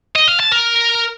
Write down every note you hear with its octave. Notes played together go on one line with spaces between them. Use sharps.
D#5
F5
A5
A#4